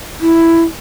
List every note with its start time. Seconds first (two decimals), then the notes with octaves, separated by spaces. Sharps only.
0.21 E4